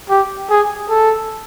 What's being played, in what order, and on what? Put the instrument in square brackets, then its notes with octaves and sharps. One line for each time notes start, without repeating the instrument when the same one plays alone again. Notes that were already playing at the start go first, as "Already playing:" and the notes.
[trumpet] G4
G#4
A4